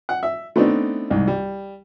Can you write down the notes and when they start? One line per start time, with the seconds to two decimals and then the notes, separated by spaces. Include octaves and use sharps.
0.09 F#5
0.23 E5
0.56 A3 B3 C4 D4 D#4
1.10 C2 G#2
1.27 G3